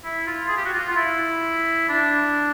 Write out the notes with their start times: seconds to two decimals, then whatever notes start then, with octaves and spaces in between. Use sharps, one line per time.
0.04 E4
0.27 F4
0.48 G#4
0.57 G4
0.65 F#4
0.73 F4
0.90 F4
0.96 E4
1.89 D4